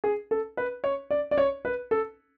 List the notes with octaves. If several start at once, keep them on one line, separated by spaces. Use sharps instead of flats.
G#4
A4
B4
C#5
D5
D5
C#5
B4
A4